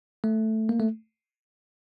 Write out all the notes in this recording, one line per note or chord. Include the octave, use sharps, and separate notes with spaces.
A3
A#3
A3